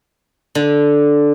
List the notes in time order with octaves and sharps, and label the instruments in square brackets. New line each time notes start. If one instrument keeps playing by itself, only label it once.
[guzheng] D3